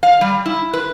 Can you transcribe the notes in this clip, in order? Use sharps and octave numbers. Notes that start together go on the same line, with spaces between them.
F5
G3
E4
B4